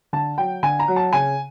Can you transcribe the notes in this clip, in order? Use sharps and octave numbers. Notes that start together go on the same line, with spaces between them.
D3 A5
F#3 G5
D3 G#5
A#5
F#3
A5
C#3 G#5